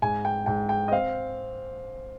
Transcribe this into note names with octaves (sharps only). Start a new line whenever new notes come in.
G#2 G#5
G5
G#2 G5
G5
D#5
C4 F5